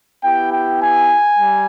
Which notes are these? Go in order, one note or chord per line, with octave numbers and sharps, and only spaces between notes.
B3 E4 G4 G5
G5
G#5
G3